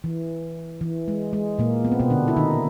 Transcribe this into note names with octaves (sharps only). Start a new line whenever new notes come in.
E3
E3
G#3
G#3
A#2 A#3
B3
C4
B2 B3
D3 D4
E4
D#3 D#4